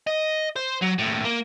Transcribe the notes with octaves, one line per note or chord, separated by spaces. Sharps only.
D#5
C5
F#3
D#2 A2
A#3